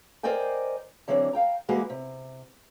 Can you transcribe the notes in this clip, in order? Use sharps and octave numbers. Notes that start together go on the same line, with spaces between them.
A#4 C5 D5 D#5 G5 G#5
D3 E3 F#3 C4 D4
F5 G5 A#5
E3 G3 G#3 A#3 F#4
C3